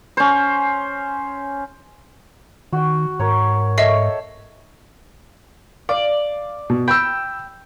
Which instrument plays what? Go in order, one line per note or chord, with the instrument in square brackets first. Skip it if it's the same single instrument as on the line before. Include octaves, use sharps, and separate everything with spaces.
[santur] C#4 C5
[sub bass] D#3 [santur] F#4 G5
[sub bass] G#2 [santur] A#4 C#5
[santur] A4 C#5 G5 [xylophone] D#5 E5 C7
[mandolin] D5 [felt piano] F5
[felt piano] B2
[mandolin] G5 [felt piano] B5 E6